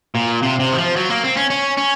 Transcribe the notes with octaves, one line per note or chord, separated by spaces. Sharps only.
A#2
C3
C3
D#3
F3
F#3
A#3
C4
C#4
C#4
C#4